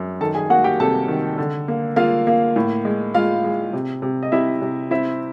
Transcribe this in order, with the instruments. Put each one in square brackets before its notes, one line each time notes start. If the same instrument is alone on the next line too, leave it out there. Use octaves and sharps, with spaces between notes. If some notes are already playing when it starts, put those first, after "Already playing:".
Already playing: [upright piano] F#2
D#3 A4 A5
G#4 G#5
A#3 F#4 F#5
G4 G5
C3 A4 A5
D#3
D3
A#3
A#3 F4 F5
A#3
A2
G#3
G#3 F4 F5
G#3
C3
C3
D#5
C3 E4 E5
C3
C4 E4 E5